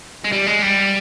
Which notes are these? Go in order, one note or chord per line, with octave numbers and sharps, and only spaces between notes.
G#3
G3
G#3
G3